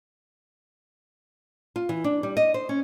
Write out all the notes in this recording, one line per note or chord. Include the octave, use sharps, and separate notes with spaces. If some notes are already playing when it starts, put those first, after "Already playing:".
F4
E3
D4
G3
D#5
C5
C#4